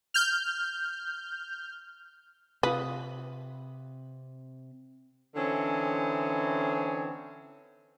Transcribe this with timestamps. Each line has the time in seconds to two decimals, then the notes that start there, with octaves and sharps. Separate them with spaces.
0.14 F6 G6
2.63 C3 F4 B4 B5 D#6
5.35 D3 E3 C4 C#4 D#4